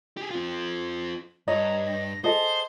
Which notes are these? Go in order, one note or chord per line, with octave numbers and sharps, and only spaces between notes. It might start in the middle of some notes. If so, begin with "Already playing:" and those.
G4 G#4
C4 F4
G2 C#5 D#5 A#5
A#6
G#4 A4 C5 D#5 G7